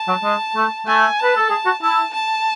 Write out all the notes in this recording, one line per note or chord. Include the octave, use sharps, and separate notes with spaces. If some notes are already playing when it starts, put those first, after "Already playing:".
Already playing: A5
F#3
G#3
A3
A3 G#5
B4 A5
A4
G#4
F#4
E4 A5
A5